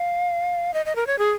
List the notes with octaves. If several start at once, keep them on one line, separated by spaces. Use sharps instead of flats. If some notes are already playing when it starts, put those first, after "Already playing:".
Already playing: F5
D#5
D#5
A#4
C#5
G#4